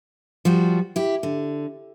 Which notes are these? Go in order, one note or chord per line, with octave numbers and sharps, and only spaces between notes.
F3 G3 F#4
E4 G4
D3